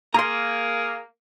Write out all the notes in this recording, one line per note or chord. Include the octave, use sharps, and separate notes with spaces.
A#3 G#4 A#5 C6